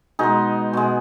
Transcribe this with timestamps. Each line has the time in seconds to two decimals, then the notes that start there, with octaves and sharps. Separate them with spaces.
0.19 B2 G#3 D#4 G#4
0.73 B2 G#3